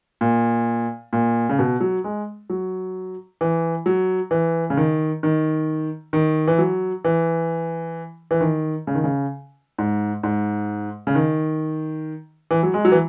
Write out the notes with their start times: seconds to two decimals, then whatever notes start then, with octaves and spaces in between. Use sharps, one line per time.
0.21 A#2
1.13 A#2
1.49 C#3
1.59 B2
1.81 F#3
2.04 G#3
2.50 F#3
3.41 E3
3.86 F#3
4.31 E3
4.70 C#3
4.77 D#3
5.23 D#3
6.13 D#3
6.48 E3
6.59 F#3
7.05 E3
8.31 E3
8.41 D#3
8.87 C#3
8.95 D#3
9.04 C#3
9.78 G#2
10.23 G#2
11.07 C#3
11.15 D#3
12.51 E3
12.63 F#3
12.74 G#3
12.85 F#3
12.92 E3